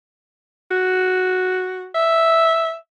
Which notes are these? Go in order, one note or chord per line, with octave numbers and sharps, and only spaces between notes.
F#4
E5